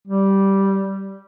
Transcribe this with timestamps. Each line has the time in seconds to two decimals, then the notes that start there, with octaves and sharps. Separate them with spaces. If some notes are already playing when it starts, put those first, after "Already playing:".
0.08 G3